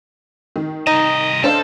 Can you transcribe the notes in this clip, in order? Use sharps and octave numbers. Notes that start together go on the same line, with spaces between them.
D#3
C2 D#4 D#5
D4 A4 C5 F5